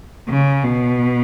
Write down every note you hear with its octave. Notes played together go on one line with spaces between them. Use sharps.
C#3
B2